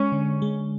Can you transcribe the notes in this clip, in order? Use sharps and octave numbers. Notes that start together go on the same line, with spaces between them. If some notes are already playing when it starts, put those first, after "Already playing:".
Already playing: G#3 C#4
D3
G#3